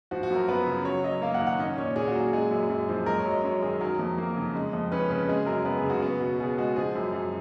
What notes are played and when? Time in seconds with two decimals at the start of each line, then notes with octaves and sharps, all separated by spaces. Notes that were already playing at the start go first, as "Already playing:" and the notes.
0.11 F3 F#4
0.23 F#4
0.30 F#2 A#4
0.48 B3 B4
0.67 C#3
0.85 F#3 C#5
1.04 F#2 D#5
1.22 A#3 F5
1.34 F#5
1.41 D#3
1.47 F#5
1.59 C#4 D#5
1.77 A#2 C#5
1.96 A#2 G#4
2.08 F#4
2.15 F#3 G#4
2.33 G#3 G#4
2.51 F#2
2.69 F#2
2.89 F3
3.06 G#3 A#4
3.19 C#5
3.25 F#2
3.31 D#5
3.44 F#2 C#5
3.62 D#3 G#4
3.81 F#3 A#4
3.99 F2
4.18 A#3
4.37 C#3
4.55 G#3
4.73 F2
4.92 C#4 B4
5.10 C#3 B4
5.28 G#3 G#4
5.46 F#2 A#4
5.65 B3 B4
5.78 G#4
5.84 C#3
5.90 F#4
6.02 B3
6.20 B2
6.40 B2 G#4
6.58 G#3 F#4
6.76 F3 G#4
6.95 F#2
7.13 F#2